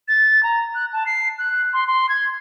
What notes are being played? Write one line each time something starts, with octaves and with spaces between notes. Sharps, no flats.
A6
A#5
F#6
A5
C7
F#6
C6
C6
G#6